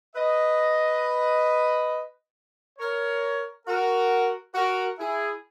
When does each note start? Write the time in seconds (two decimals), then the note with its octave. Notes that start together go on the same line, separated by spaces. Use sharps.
0.15 B4 D#5
2.79 A#4 C#5
3.67 F#4 A#4
4.55 F#4 A#4
4.99 E4 G#4